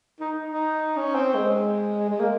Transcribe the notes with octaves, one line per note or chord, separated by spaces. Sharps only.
D#4
D#4
C#4
C4
G#3
G#3
A#3